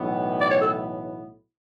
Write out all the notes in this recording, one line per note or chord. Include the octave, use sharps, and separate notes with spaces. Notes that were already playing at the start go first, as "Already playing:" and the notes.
Already playing: B1 A2 E3 B3
D5
C#5
A4